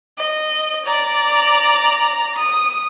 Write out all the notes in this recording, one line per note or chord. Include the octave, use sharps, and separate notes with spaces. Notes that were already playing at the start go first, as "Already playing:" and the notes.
D#5
D5 A#5
D#6